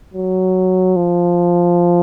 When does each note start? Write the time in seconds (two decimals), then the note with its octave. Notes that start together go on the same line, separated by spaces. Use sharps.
0.14 F#3
0.96 F3